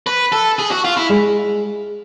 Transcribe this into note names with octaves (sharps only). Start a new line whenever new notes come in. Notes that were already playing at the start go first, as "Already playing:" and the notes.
B4
A4
G#4
F#4
F4
E4
G#3